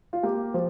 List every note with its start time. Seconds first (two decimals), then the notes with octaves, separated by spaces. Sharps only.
0.13 F4
0.23 A#3 G4
0.54 F3